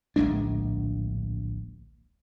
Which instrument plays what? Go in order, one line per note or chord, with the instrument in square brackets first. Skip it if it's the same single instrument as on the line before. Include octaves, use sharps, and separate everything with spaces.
[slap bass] D1 A#1 G#3 D4